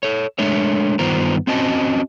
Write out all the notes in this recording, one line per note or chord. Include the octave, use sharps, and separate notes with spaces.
A4 C#5
G#3 A3 D4 C#5 E5
G2 D#3 B3 F4 C5 A#5
C4 C#4 F#4 D#5 A5